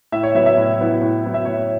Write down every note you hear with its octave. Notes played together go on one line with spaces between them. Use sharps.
A2 E5
C#5
F#3 B3 E4 E5
E5
A2
F#3 B3 E4
A2
F#3 B3 E4
E5
A2 C#5